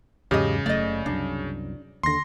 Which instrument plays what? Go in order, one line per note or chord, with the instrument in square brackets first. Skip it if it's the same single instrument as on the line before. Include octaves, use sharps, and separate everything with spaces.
[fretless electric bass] E2 G#2 F#3 [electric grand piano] C#3 [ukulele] G4 D#5
[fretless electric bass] F#1 F#2 A3 [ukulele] D5 D#5
[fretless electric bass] C2 F#2 [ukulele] D4
[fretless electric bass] D#2 D3 [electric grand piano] C6 A#6